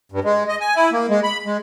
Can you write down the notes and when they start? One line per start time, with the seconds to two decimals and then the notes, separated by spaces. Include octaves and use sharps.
0.12 G2
0.24 G#3
0.48 D#5
0.61 G#5
0.75 E4
0.92 A#3
1.09 G#3
1.24 B5
1.45 G#3